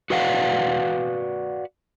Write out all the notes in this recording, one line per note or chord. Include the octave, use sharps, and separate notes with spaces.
F#4 B4 D5 F5 F#5